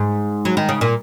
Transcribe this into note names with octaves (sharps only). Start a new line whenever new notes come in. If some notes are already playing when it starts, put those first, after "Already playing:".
Already playing: G#2
F#3
D#3
C#3
A#2